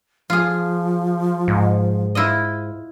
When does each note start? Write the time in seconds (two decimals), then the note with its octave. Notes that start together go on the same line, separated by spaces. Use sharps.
0.30 F3 F4 G#4
1.48 G#2
2.15 E4 F4 D#5